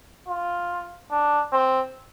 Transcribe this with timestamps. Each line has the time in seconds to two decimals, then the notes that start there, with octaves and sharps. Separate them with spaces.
0.28 F4
1.11 D4
1.53 C4